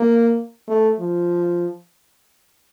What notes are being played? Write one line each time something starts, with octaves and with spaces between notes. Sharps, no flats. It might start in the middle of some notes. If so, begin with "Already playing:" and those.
Already playing: A#3
A3
F3